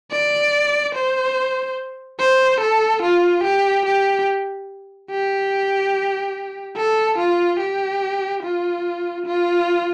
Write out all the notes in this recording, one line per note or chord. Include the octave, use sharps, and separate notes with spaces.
D5
C5
C5
A4
F4
G4
G4
G4
A4
F4
G4
F4
F4